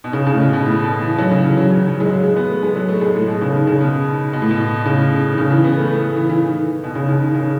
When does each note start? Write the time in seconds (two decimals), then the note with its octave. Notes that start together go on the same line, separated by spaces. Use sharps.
0.04 B2
0.13 C#3
0.26 C#3
0.34 A2
0.40 B2
0.53 B2
0.66 A2
0.84 B2
1.01 E3
1.18 F#3
1.31 C#3
1.44 E3
1.57 F#3
1.71 F#3
1.88 F#3
2.00 G#3
2.06 F#3
2.23 G#3
2.36 B3
2.49 A3
2.62 G#3
2.76 F#3
2.88 A3
3.01 G#3
3.15 A2
3.28 B2
3.41 C#3
3.54 D#3
3.67 C#3
3.80 B2
4.33 B2
4.42 A2
4.51 B2
4.86 C#3
5.33 D#3
5.38 C#3
5.51 E3
5.64 B3
5.77 A3
5.90 A3
6.17 E3
6.30 E3
6.43 D#3
6.84 B2
6.95 C#3
7.08 C#3
7.22 D#3
7.35 C#3